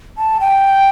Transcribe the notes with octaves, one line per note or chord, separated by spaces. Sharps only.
A5
G5